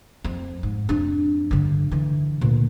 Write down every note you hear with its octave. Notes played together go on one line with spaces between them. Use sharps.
F2
G#2
F2 D4
G2 D3
D3 E3
D2 A#2